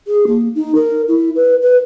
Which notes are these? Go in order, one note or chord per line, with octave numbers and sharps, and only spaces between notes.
G#4
A#3
D#4
A#4
E4
B4
B4